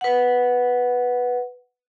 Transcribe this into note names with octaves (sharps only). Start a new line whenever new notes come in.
B4 F#5